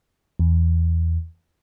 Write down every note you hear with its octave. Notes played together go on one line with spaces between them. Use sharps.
E2